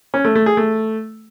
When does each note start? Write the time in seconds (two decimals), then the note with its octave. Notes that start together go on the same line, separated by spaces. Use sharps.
0.14 C#4
0.25 A3
0.35 A3
0.46 G#4
0.57 A3